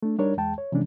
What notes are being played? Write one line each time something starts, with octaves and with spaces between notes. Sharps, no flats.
A3 D4
G3 D4 D#4 A#4 C#5
E2 G#3 G5 A5
C#5
C3 E3 F3 G#3 C#4 D4